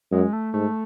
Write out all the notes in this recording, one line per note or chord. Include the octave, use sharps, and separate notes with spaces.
F#2 G#3
A3
G#2 A3